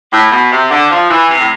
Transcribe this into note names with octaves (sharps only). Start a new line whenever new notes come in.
A2
B2
C3
D3
F3
E3
C3
A2